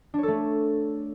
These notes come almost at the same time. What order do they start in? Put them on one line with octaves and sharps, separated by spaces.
D4 C#5 A4 A3